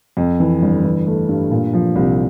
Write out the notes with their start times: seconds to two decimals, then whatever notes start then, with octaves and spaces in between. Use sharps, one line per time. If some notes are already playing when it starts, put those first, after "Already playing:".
0.17 F2
0.40 E3
0.62 G1
0.84 E3
1.07 A3
1.29 G2
1.51 A#2
1.73 F3
1.96 C2